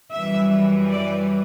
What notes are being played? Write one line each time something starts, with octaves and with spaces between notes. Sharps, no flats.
F#2 E3 G3 E5
D5